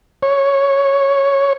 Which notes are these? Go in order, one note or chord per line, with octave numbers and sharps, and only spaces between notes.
C#5